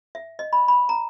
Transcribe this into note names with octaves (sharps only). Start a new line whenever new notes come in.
E5
D#5
B5
B5
A#5